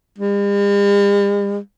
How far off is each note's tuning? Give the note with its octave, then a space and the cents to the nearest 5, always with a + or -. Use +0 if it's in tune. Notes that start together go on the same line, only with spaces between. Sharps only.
G3 +45